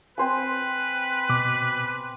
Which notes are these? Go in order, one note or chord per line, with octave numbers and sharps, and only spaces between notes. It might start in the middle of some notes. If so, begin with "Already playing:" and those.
C4 B4 C5 G#5
B2 D6